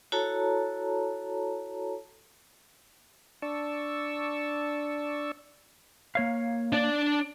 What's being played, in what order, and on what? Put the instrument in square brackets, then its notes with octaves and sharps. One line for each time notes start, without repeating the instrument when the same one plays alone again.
[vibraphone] E4 F#4 A4 C#5 A5 A#5
[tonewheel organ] D4 D5 A5 C#6 E6
[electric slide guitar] A#3 C#5 F5
[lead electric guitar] D4 D5